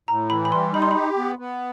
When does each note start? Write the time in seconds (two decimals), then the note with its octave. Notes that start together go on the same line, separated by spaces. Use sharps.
0.08 A2 A#5
0.30 E3 B5
0.45 B5
0.52 G3 C6
0.73 D#4 B5
0.82 C6
0.91 G4 B5
1.17 B3
1.39 B3